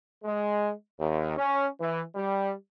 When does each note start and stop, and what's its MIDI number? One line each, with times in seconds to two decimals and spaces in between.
0.24 0.72 56
1.00 1.35 39
1.37 1.66 61
1.80 2.02 52
2.15 2.53 55